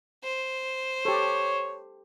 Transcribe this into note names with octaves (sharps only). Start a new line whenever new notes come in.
C5
G4 A4 C#5